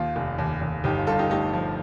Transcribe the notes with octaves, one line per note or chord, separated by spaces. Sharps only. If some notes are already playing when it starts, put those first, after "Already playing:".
Already playing: D#2 D#3 A#3 F4
F1
D#2
D#2
G1 D#4 G4
F4
G2 F4 A4
D#4 G4
A3 D#4 G4
F3